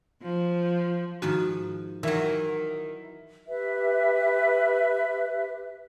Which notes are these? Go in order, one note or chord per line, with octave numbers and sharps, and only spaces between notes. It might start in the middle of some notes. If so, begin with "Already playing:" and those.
F3
G#2 D#3 F3 F#4
D#3 E3 F#3 E4 E5
G4 B4 E5